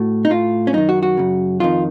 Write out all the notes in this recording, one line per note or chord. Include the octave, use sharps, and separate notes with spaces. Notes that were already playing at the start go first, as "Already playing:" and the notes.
Already playing: A2 F#4
D#4
A2 F4
C#4
F#2 D#3 D#4
F#4
F#4
F#2 C#3
F2 D#3 F4